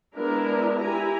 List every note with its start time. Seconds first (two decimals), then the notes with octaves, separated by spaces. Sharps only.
0.15 G#3 B3 D4 E4 A#4
0.80 E4 G4 G#5 A#5